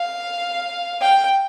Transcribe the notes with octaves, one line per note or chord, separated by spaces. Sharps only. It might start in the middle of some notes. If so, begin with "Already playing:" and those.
Already playing: F5
G5